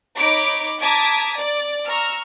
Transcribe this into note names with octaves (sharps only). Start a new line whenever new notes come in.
D#4 C#5 B5 D6
A5 A#5 D6 D#6 G#6 B6
D5
A#5 C#6 E6 F6